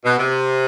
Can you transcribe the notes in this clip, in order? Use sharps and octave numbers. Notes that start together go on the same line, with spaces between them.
B2
C3